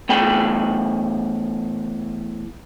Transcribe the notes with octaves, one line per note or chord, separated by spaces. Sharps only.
E2 A3 G5 B5